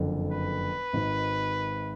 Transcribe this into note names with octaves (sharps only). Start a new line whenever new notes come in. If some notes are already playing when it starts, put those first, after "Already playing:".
Already playing: F#1 F2 D3
B4
G#1 G#2 D#3